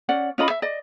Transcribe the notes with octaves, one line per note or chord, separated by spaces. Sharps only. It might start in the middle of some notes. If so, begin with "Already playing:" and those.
C#4 D5 F#5
C#4 F4 D#5 B5
E5
D5 D#5